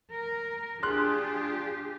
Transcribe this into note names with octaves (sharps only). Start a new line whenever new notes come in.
A#4
D4 F4 G4 G#4 C6 F6 F#6